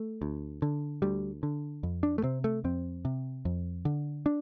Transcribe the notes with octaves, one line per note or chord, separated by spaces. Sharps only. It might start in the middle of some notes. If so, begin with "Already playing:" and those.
Already playing: A3
D2
D3
D2 G3
D3
F2
D4
A3
C3 C4
A3
F2 C4
C3
F2
D3
D4